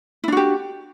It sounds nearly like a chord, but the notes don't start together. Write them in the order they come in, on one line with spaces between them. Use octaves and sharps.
E4 D4 F#4 G4